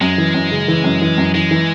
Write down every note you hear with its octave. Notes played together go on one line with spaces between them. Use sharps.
F#2 G#3
E3
F#2
C#3
E3
F#2
E3
F#2
E3 G#3
E3